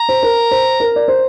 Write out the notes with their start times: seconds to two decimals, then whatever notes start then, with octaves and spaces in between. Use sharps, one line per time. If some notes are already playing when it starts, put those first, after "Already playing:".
Already playing: A#5
0.09 C5
0.23 A#4
0.51 C5
0.80 A#4
0.96 D5
1.08 C5